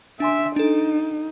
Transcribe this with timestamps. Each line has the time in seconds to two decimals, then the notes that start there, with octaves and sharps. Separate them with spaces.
0.20 D4 E5 G#5 C6
0.56 D4 D#4 A4